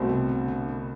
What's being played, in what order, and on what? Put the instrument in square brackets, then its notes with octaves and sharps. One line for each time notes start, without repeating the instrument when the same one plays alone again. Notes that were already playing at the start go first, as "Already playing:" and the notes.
Already playing: [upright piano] C2 B2 A3 C4
[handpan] C3
D3
D3
D3